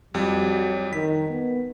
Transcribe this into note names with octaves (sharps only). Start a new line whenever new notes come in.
F2 F#3 G3
D#3 B6
B3